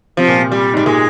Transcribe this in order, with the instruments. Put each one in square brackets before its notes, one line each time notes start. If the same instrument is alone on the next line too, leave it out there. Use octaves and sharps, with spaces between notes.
[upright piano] C3 [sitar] F3
[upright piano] A#2
C3
[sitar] G3
[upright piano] G#2 [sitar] G3
[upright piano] A#2 [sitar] G#3